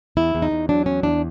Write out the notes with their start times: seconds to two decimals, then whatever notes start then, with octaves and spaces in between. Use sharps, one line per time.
0.17 E2 E4
0.35 E2
0.42 D#4
0.51 E2
0.69 F#3 D4
0.86 E2 C#4
1.03 E2 D4